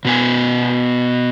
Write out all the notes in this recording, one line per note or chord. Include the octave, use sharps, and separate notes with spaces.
B2 B3 G#5